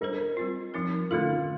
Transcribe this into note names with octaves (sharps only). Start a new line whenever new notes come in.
G3 D4 A4 A#4 C5
G3 C4 F4
F3 C4 D#4 A#4
D3 A3 D#4 F4 A4